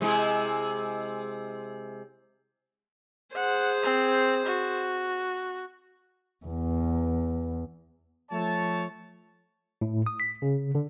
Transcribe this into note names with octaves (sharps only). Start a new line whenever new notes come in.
C3 G#3 E4
G#4 C5 F#5
C4
F#4
E2
F3 A3 C#5 A5
A2
D#6
B6
C#3
D3